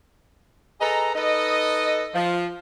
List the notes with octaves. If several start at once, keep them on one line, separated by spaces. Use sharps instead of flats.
G#4 A4 B4 D#5 A#5
D#4 A4 B4 D#5
F3